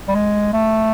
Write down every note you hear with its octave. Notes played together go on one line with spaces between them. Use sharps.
G3
G#3
A3